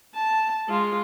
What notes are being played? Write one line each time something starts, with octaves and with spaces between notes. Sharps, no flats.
A5
G#3 F4